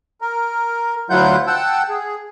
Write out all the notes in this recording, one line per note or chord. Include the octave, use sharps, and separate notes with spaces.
A#4
D2 F#3 E4 F4 F#5 G6
F#5 G5 A5 E6
G#4